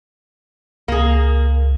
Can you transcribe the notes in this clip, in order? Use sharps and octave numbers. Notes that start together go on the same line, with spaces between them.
C#2 A#3 G#4